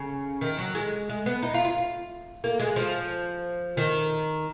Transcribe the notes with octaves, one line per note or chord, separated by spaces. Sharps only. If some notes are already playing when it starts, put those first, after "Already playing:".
Already playing: C#3
D#3
F#3
G#3
G#3
B3
D#4
F4
F4
A#3
G#3
F3
D#3